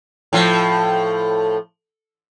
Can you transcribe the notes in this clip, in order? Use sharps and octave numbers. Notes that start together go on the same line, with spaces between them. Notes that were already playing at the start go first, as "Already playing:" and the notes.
A2 F3